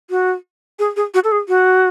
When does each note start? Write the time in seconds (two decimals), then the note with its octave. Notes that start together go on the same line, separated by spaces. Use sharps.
0.10 F#4
0.79 G#4
0.96 G#4
1.14 F#4
1.24 A4
1.32 G#4
1.48 F#4